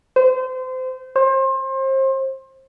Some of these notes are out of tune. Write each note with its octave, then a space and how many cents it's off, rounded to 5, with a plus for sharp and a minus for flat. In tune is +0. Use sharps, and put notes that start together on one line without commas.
C5 -30
C5 +30